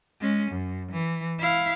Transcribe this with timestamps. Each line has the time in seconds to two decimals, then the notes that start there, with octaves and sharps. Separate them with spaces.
0.21 G#3 C#4
0.51 F#2
0.92 E3
1.40 E4 F5